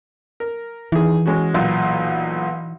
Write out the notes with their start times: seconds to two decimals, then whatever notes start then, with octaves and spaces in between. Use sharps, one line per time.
0.40 A#4
0.92 D#3 E3 G#4
1.26 G#3 C#4 F#4
1.54 B1 A#2